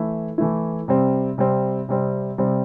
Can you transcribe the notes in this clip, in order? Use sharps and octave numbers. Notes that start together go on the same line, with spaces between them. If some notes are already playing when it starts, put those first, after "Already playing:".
Already playing: E3 A3 E4
E3 A3 E4
C3 G3 C4
C3 G3 C4
C3 G3 C4
C3 G3 C4